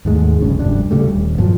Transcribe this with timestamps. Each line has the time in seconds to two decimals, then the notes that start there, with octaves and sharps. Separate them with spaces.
0.05 D#2 G#2 G#3 A3
0.40 F1 C#2 G2 C#4
0.59 F1 D2 G2 D4
0.91 D2 C#3 G3 A3
1.08 D#1
1.38 G2 A#2 F3 F#3